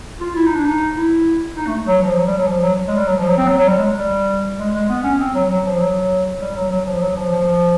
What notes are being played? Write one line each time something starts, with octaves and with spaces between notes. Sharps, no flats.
F4
E4
D#4
D4
D#4
E4
D#4
A3
F#3
F3
F#3
G3
F#3
F3
F#3
G#3
G3
F#3
F3
F#3
C4
F#3
F#3
G3
G#3
G3
G#3
G#3
B3
C#4
C4
F#3
F#3
F3
F#3
G3
F#3
F#3
F3
F#3
F3
F3
F3